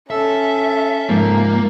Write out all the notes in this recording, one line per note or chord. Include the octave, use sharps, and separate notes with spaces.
C#4 A4 E5
G#2 F3 A#3